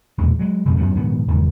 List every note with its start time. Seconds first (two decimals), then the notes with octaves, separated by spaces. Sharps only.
0.18 B1 E2 A#2 G#3
0.39 F#3 G#3
0.65 F#1 F2 B2 G#3
0.78 F#2 F#3 G3 B3
0.95 A#1 G#2 D#3 B3
1.28 F#1 E2 G#2 D#3